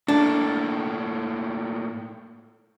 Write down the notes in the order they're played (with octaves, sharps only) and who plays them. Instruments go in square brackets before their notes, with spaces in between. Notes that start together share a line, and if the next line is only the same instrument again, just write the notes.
[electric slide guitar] A2 A#3 A4 [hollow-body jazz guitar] D4